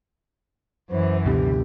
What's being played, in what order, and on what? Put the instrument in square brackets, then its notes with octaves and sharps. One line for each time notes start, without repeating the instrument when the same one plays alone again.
[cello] F#2 E3 [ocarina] C5
[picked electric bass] C#2 B2 D3 [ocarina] G4